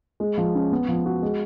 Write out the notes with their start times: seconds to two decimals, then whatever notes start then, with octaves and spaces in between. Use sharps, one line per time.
0.20 G#3
0.38 F3
0.55 C#4
0.72 B3
0.88 F3
1.06 F#4
1.22 G#3